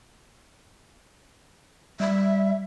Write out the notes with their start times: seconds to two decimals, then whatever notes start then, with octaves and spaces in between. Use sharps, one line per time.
2.00 G3 E5